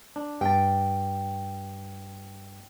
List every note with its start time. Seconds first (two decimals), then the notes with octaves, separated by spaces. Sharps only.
0.16 D4
0.41 G2 G5 A5